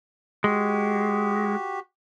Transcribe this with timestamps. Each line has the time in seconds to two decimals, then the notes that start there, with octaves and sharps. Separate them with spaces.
0.44 G#3 F#4 G4